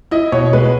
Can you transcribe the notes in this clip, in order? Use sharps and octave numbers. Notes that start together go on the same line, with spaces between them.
E4 D#5
B2 C#5
G#3 B4